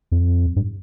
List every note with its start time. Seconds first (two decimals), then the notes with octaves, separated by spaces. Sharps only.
0.12 F2
0.56 G2